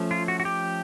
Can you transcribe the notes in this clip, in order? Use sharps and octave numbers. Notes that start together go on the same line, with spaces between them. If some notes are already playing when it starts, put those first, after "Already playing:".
Already playing: F3 A3 C#4
F4
F#4
F#4
G4